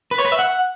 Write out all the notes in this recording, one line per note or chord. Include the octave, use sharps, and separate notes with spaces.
B4
C#5
B4
E5
F#5